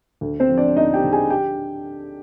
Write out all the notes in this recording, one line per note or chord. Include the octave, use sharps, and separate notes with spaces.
D2
C4 C5
F3
D4 D5
D2 D#4 D#5
G4 G5
D3
G#4 G#5
G4 G5